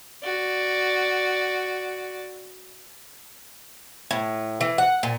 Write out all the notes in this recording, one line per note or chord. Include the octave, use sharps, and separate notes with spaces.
F#4 D5
A2
E3
F#5
A#2